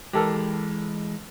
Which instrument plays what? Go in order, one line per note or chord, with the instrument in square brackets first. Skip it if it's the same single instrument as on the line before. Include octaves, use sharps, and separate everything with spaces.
[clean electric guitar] E3 G#3 [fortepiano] G4 A4 A#4